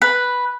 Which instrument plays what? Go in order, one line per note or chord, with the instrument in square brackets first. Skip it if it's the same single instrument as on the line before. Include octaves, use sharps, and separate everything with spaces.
[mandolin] B4